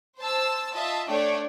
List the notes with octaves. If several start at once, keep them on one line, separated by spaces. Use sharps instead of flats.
C5 A5 E6
F4 D#5 E5 A5
A3 D4 C#5 D5 G5